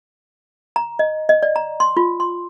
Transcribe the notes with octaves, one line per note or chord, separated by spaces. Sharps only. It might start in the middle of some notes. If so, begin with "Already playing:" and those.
A#5
D#5
D#5
D5
A#5
C6
F4
C6